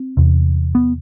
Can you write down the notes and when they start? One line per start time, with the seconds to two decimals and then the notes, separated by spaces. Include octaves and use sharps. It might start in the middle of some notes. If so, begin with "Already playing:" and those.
Already playing: C4
0.17 E2 C3
0.75 B3